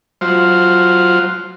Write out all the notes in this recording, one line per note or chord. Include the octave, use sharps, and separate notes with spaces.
F#3 F4 C5